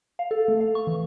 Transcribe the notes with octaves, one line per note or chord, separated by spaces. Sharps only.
F5
A4
A3
F5
C#6
E3